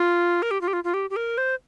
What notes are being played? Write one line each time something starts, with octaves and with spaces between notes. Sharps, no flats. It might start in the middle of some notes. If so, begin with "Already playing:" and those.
Already playing: F4
A#4
G4
F4
G4
F4
F4
G4
G4
A#4
C5